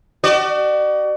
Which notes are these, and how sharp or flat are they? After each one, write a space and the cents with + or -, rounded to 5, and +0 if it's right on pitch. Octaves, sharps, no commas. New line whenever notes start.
F#4 +40 D5 +40